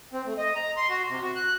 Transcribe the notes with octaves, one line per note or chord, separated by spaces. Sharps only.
C4
A3
D#5
A#5
C6
F#4
C3
F#4
F#6